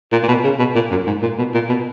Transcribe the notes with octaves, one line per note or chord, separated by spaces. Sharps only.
A#2
A#2
B2
C#3
B2
A#2
F#2
G#2
A#2
B2
A#2
B2